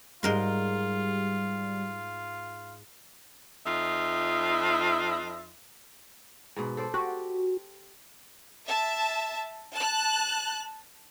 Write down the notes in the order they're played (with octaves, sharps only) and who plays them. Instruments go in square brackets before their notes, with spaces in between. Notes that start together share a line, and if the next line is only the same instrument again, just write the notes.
[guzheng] G#2 A#4 C6 [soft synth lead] G3 [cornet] F4
[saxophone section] F2 D#4 F4 E5
[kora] G#2 B2
A4 C5 D5
[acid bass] F#4 [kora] G4
[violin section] E5 A5
A5 F#6